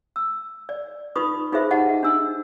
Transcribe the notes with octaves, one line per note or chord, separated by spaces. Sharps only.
E6
D5
D#4 F4 B4 B5 C#6 D#6
D#4 F4 G#4 B4 C5 E5
D#4 F4 G4 D#5 F#5 A5
D4 E6